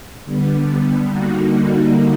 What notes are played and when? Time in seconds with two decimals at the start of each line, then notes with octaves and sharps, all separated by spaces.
0.24 D3 G3 B3
1.08 D3 G3 A#3 D#4 F#4